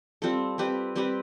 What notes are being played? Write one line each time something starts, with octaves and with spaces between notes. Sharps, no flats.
G3 C4 F4 A4
G3 C4 G4 B4
G3 C4 G4 B4